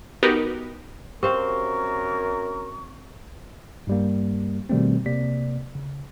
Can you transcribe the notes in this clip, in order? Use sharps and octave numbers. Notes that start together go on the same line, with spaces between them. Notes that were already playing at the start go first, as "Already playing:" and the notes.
B3 D#4 F#4 G4 A#4 B4
F#2 C4 G4 A#4 C5 F5 C#6
G2 G3 A#3
B2 D#3 G3 A3 C4
C3 A#3 D5 B6
C#3